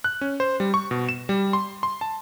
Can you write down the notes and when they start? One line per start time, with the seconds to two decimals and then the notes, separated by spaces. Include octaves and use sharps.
0.04 F#6
0.21 C#4
0.40 C5
0.60 G3
0.74 C#6
0.91 B2
1.09 E7
1.29 G3
1.53 C6
1.83 C6
2.01 A5